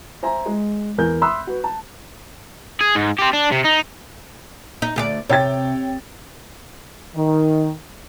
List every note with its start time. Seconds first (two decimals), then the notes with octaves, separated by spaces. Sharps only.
0.23 C5 E5 G#5 A#5
0.46 G#3
0.98 E2 A#4 G#5 G6
1.22 E5 B5 C6 D#6 E6 F#6
1.47 F#4 B4
1.64 A5
2.80 G#4
2.95 G#2
3.19 C4 G4
3.33 D4
3.51 C3
3.64 D#4
4.82 D#4
4.96 D2 G4 D5
5.29 C3 C#5 G5 A6
7.16 D#3